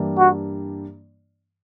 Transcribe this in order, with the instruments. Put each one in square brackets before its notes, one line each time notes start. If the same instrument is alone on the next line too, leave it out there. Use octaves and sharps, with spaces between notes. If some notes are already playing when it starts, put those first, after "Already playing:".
Already playing: [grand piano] G2 E3 G3 A#3 D4
[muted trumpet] F#4